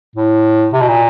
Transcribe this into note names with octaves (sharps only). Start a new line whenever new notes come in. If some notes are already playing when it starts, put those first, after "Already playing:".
A2
C3
B2
A#2